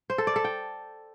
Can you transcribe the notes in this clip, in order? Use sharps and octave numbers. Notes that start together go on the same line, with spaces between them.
C5
A4
D5
A4
G5